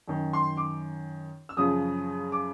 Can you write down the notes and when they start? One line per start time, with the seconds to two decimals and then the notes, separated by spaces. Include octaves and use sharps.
0.08 F#2 D#3
0.33 C6
0.57 D6
1.49 E6
1.57 F#2 C#3 F3 D#6
2.32 D6